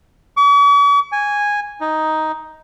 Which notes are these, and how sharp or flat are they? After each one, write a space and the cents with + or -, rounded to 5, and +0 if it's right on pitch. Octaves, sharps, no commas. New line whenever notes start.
C#6 +45
G#5 -10
D#4 +5